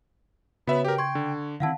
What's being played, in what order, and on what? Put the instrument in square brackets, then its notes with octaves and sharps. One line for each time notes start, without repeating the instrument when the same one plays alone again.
[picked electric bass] C#3 [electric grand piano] B3 E5 [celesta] F#4 B4 C#5 [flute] B5
[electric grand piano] G4 A#4 [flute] G5
[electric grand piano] C6 [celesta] C#6 G#6
[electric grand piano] D3
[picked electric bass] D3 D#3 C4 [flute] E4 [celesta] F5 F#5 A5